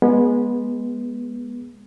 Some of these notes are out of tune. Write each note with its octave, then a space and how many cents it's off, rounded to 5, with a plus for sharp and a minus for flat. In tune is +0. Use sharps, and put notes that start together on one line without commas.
G#3 +0 B3 -25